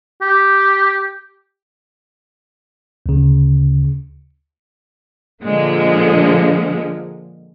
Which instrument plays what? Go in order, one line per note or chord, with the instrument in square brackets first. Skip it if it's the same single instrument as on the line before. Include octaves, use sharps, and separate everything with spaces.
[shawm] G4
[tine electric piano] D2 C#3
[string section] A#2 D3 F3 G#3 A#3